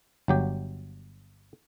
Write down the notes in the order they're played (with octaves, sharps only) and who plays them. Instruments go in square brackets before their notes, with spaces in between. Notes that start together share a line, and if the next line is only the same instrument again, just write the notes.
[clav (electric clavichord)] G1 F#3 G4